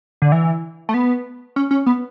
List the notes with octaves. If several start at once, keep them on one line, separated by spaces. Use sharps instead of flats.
D3
E3
A3
B3
C#4
C#4
B3